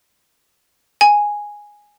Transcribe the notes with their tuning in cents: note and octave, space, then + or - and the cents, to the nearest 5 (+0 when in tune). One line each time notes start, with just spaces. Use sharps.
G#5 -5